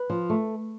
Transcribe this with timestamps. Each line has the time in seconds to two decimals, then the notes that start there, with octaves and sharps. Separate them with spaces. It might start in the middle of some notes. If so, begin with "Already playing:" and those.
Already playing: B4
0.10 F3
0.30 A3